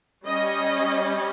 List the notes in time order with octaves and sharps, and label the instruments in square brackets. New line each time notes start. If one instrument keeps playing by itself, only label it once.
[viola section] G3 C#4 D#5